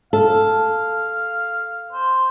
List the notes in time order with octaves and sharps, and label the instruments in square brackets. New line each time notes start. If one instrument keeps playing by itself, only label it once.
[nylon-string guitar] A4 [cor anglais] F5
[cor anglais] C5